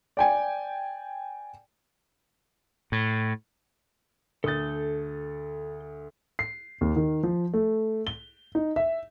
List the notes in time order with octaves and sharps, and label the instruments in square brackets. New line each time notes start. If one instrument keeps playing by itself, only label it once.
[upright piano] D5 G5 G#5
[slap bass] A2
[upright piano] D2 D#6 A6 [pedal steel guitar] A4 G6
[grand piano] C7
D#2
D#3
F3
A3
G7
D#4
E5